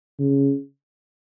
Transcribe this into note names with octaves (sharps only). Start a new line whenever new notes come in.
C#3